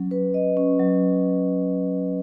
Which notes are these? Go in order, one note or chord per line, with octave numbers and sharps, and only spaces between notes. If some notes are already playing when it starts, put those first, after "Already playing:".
Already playing: F#3 C#4
B4
D#5
C#4
F#3